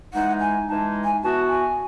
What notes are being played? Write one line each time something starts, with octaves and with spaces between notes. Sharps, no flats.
E3 G#3 D#4 F#5
G#5
E3 G#3 D#4 A5
G#5
E3 B3 F#4 A5
G#5